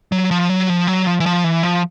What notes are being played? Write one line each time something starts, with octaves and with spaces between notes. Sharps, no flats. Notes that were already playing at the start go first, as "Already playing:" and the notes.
F#3
F3
F#3
F3
F#3
F3
E3
F3
E3
F3